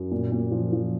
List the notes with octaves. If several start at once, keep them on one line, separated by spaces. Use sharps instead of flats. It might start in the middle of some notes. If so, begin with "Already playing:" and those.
Already playing: F#2
A#2
A#2
F3
F3